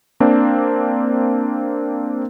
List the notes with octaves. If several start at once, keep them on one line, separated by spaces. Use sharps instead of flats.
A#3 C4 D4